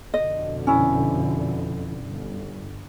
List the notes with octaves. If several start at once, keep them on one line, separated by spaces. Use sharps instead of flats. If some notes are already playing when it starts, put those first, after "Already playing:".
F2 B2 D3 D#5
C#4 E4
G1